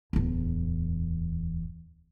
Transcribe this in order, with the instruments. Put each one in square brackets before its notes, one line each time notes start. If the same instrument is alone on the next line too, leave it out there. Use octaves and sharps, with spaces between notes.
[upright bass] D1 E2